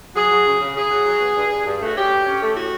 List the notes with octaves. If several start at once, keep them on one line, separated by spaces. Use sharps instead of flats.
F#3 G#4
F#3
C#3
C#3
C#3 G#4
F#3
F#3
B3
G2
G2
G2
A3 F#4
C#4 G4
G2
C#4
A3
A2 F#4